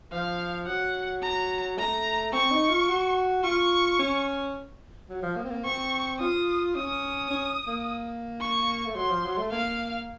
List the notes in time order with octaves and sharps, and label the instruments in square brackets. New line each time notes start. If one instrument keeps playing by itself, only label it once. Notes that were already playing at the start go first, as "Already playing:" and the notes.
[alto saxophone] F3 [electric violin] F5
[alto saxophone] F#3 [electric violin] F#5
[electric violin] A#5
[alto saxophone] A3 [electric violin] A#5
[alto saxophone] C4 [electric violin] C#6
[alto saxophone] D#4
F4
F#4
[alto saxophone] F4 [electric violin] C#6
[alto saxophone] C#4
F#3
F3
A#3
C4
A#3
[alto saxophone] C4 [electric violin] C#6
[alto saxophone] F4 [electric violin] D#6
[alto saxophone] C#4 [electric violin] D#6
[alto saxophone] C#4
A#3
[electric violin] C#6
[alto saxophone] A3
[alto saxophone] F#3 [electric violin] C6
[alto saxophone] F3
F#3
A3
[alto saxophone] A#3 [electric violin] F5